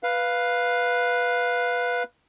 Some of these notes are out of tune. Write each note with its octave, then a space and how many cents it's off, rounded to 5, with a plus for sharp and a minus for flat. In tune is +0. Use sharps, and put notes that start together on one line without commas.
B4 -5 F5 +0